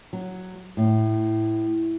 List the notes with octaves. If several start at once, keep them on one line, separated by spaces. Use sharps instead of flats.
F#3
A2